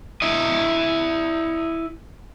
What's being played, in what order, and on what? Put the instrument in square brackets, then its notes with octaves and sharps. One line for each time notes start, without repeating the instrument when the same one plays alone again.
[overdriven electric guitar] E4 D#5